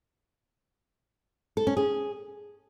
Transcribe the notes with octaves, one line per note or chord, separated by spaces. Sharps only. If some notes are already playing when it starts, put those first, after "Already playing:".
A4
C#4
G#4